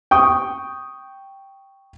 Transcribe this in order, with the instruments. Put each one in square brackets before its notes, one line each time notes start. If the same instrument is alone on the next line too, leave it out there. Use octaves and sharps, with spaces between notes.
[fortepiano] G5 C#6 D#6